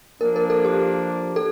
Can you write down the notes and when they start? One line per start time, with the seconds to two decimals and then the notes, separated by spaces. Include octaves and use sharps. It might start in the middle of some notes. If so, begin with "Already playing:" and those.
0.20 F3 A#3 D4 A#4
0.36 A#4
0.50 A4
0.65 G4
1.36 A4